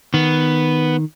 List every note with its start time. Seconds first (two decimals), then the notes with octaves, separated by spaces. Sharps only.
0.14 D#3 B3